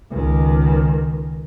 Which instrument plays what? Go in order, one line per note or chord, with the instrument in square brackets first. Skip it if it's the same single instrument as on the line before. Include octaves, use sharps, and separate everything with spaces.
[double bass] C#2 D#3